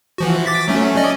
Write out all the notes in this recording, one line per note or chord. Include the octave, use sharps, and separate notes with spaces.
E3 F3 F#4
D6 A6 B6
F#3 A3 C#4
C#4 D5 D#5